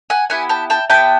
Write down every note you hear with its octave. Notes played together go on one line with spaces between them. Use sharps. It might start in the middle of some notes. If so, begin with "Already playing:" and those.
F#5 G#5
B3 E4 G4 F#5 G#5
G5 A5
G5 A5
B3 E4 G4 G5 A5